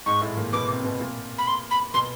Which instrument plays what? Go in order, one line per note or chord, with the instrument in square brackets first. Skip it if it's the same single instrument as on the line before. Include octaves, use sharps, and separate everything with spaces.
[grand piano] G#2 G#3 [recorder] C#6
[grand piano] A2 A3
A#2 A#3
[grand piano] B2 B3 [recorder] D6
[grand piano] C3 C4
B2 B3
A#2 A#3
[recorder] B5
C6
B5
[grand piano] B2 B3 [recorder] C6